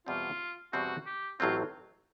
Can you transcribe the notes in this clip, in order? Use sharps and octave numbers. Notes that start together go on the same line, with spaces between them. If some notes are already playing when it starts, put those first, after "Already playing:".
E2 B2 G3 C4 F4
E2 B2 G3 C4 F#4
G4
A1 A2 F#3 A3 C4 F4